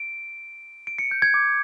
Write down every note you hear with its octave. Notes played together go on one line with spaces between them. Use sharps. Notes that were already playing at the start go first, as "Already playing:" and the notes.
Already playing: D7
D7
C#7
G6
G#6
D6